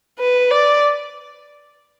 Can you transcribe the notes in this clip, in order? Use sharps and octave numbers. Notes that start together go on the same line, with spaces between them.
B4
D5